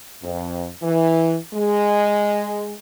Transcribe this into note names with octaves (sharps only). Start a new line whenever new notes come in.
F2
E3
G#3